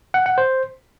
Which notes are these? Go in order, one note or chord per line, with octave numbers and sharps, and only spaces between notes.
F#5
F#5
C5